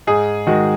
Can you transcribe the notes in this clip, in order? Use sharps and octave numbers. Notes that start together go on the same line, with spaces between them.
G#2 G#4
D#3 G#3 F#4